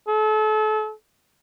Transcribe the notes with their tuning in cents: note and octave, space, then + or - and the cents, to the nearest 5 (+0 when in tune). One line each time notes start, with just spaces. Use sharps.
A4 -35